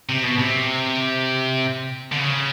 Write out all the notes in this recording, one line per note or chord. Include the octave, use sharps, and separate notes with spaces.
C3
B2
C3
D3
C#3